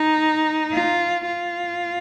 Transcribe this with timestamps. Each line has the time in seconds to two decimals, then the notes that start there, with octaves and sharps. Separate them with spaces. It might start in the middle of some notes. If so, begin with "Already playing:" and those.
Already playing: D#4
0.72 F4
1.26 F4